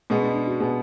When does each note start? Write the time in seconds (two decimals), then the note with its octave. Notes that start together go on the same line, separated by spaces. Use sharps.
0.10 B2 G#3 B3 C#4
0.22 D4
0.34 D4
0.47 F#4
0.60 B2 G#3 B3 G#4